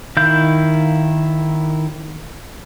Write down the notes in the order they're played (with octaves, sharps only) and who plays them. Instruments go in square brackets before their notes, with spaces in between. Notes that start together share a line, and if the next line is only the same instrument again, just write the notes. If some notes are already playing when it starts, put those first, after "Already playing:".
[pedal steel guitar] D#3 E4 F5 G6